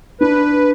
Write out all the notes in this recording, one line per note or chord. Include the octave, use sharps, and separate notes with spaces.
D4 B4